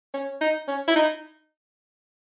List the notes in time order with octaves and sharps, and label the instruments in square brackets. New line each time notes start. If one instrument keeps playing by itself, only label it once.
[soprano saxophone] C#4
D#4
C#4
E4
D#4